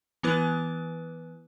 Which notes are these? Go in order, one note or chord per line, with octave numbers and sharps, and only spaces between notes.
E3 B3 E4 B4 F#6